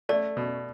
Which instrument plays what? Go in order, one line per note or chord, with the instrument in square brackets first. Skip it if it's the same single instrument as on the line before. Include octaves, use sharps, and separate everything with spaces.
[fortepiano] A3 [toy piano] D5
[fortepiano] B2